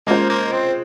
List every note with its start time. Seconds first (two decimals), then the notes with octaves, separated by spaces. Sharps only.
0.07 G#3 A#3 C#4 F4 C5
0.30 A#3
0.52 C4